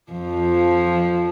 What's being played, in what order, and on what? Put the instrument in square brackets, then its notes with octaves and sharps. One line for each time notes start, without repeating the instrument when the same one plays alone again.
[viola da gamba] F2 F3